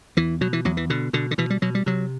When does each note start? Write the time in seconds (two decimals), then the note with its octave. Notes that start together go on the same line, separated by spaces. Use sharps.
0.17 E2 E3
0.41 B2 F#3
0.53 E3
0.65 E2 F#3
0.77 E3
0.90 B2 D3
1.13 B2 D3
1.31 D3
1.38 B2 E3
1.50 G3
1.62 B2 F#3
1.75 G3
1.86 C3 F#3